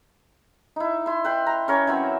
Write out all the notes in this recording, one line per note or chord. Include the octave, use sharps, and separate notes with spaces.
D#4 E4
E4 C6
B4 G5 C6
A#5
C#4 A#4 C#5
E3 F#3 C4